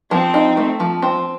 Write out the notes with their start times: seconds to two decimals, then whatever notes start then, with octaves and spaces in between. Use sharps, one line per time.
0.11 F3 C4
0.34 D#4
0.57 A3
0.80 F3
1.02 C4